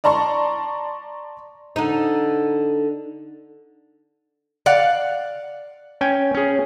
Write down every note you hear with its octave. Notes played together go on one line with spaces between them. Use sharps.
D5 A5 A#5 C6 C#6
D3 D#4
D5 F5 F#5
C#4 G5 G#5
C#4 G#4